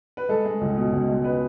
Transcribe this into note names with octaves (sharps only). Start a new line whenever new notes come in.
B4
G#3 A4
G#3
C#2
B2
C#2
G#3
B4